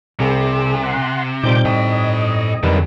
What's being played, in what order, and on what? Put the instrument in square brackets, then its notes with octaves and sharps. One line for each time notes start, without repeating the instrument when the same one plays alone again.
[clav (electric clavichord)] C2 [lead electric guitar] C3 [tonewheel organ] G#4
[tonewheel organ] F#5 C6
[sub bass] A#2 [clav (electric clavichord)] G3 C4 D#4 [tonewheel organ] D6 G6
[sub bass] A2 [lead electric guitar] A4 G5 [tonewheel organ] D#5
[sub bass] F2 [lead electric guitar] D3 F#3 [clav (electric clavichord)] D#3 G3 B4